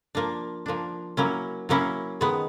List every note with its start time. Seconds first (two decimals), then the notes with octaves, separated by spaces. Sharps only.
0.15 F3 A#3 D4
0.66 F3 A#3 D4
1.17 F#3 A#3 C#4 E4
1.69 F#3 A#3 C#4 E4
2.21 D#3 G#3 B3